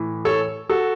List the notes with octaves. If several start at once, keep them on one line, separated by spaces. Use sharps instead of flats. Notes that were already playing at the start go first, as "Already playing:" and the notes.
Already playing: A2 E3
A4 C#5
F#4 A4